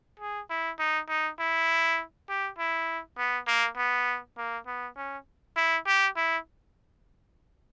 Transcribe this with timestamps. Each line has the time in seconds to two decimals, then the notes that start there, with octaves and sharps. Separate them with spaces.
0.20 G#4
0.50 E4
0.79 D#4
1.09 D#4
1.39 E4
2.29 G4
2.59 E4
3.18 B3
3.47 A#3
3.77 B3
4.38 A#3
4.67 B3
4.97 C#4
5.57 E4
5.87 G4
6.17 E4